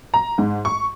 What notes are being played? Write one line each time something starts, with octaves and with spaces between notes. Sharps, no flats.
A#5
G#2
C#6